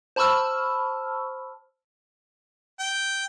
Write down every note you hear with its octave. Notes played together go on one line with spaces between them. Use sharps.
C5 A5 B5 C#6 E6 F6
G5